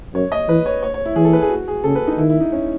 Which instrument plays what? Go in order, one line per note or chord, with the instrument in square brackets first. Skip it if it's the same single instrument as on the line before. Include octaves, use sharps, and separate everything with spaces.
[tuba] F#2 [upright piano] C#5
[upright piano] D#5
[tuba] E3 [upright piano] B4
[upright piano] C#5
C#5
C#5
E4
[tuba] E3 [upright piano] G#4
[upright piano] A4
B4
G#4
F#4
G#4
[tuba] C#3 [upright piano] A4
[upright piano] B4
D#4
[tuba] D#3 [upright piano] E4
[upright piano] E4
D#4
C#4